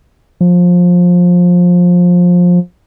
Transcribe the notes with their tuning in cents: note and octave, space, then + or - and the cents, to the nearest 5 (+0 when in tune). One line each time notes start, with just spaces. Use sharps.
F3 +20